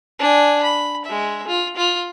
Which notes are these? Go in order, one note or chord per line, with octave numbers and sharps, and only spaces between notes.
D4 G#5
B5
G#3 E5
F4
F4